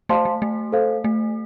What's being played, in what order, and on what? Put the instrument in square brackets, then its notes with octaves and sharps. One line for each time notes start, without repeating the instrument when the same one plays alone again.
[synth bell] A3 [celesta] C5 F5 A5 C6
[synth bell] A3
A3
[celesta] A4 C5 F5
[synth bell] A3